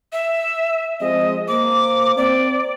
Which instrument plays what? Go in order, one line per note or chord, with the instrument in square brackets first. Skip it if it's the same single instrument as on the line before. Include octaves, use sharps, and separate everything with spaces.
[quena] E5
[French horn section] F3 G#3 C4 [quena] D#5
[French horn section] A#3 C5 [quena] D6
[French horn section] C4 [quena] D5